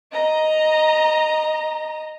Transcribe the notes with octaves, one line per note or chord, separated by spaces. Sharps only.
D#5 A#5